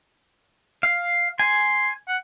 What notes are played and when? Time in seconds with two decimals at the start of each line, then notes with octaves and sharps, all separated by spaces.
0.83 F5
1.39 G#5 C6
2.09 F#5